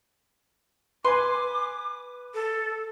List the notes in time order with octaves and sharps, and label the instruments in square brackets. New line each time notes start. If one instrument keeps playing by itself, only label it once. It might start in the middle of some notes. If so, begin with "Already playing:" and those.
[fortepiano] B4 G#5 [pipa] C6 [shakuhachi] D6
[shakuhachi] A4